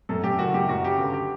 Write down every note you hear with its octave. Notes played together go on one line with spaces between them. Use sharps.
F#2 A4
F#2 G4
F#1 F#4
F#2 G4
F#2 F#4
C#3 G4
G1
G4